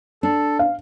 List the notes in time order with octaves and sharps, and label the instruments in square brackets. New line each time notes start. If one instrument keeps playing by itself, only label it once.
[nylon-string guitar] D4 [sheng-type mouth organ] A4
[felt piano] F5